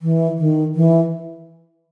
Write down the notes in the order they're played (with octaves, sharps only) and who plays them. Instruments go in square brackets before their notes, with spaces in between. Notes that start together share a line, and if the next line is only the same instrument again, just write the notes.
[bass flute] E3
D#3
E3